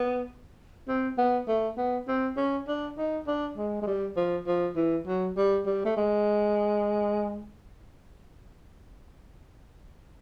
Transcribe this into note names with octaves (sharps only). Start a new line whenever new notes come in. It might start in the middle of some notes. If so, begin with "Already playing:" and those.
Already playing: B3
C4
B3
A3
B3
C4
C#4
D4
D#4
D4
G#3
G#3
G3
F3
F3
E3
F#3
G3
G3
A3
G#3